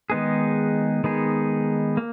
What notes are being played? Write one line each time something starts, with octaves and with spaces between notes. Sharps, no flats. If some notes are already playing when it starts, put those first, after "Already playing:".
D#3 G#3 B3 D#4 G#4
D#3 G#3 B3 D#4 G#4
A#3